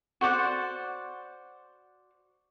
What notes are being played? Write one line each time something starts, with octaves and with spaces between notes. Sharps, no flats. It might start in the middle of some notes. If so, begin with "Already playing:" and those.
F#4 C5 D5 F#5